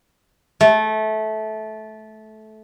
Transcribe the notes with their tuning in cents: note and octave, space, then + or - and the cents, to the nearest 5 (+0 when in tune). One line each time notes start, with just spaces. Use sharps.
A3 -20